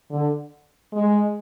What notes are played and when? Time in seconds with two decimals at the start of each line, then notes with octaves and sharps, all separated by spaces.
0.11 D3
0.93 G#3